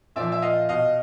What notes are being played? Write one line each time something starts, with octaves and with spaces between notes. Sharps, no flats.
A#2 F3 D5 E5
E5
D#5 F5
B2 D#5 F5